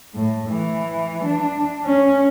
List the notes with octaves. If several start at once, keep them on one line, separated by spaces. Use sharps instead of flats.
A2
E3
D4
C#4